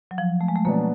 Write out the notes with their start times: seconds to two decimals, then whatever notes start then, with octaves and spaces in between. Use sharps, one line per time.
0.11 F#3
0.18 F3
0.41 A3
0.48 G#3
0.56 A3
0.65 B2 F#3 A#3 B3 D4